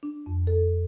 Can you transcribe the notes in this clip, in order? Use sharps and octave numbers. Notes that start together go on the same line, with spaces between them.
D4
F2
A4